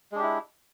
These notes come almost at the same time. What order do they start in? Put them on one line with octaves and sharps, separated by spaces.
G#3 D4 G4 E4